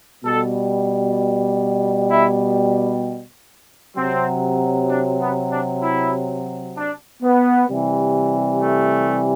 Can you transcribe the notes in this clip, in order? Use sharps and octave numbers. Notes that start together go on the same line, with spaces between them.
B2 G3 A4
E4
C3 F#3 C4
D4
B3
D4
E4
D4
B3
C3 E3 G3
A3